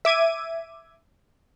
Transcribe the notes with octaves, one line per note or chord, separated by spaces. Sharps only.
E5 D6 G#6 D#7